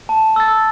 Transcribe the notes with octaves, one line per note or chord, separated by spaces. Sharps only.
A5
E6 A6